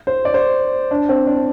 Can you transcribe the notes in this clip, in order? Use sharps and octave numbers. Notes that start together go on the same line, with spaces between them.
C5
D5
C5
D4
C4
D4